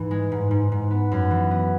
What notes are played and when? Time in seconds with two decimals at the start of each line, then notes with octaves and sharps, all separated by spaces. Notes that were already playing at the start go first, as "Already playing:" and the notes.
Already playing: G#2 E3
0.11 G#3
0.32 G#2
0.51 G#2
0.72 G#2
0.91 B3
1.11 F#2
1.31 E3
1.51 B3